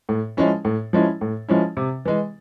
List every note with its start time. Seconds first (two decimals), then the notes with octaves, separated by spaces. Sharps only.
0.09 A2
0.37 F3 G#3 C#4 E4
0.65 A2
0.93 F3 G#3 C#4 E4
1.21 A2
1.49 F3 G#3 C#4 E4
1.77 C3
2.05 E3 G#3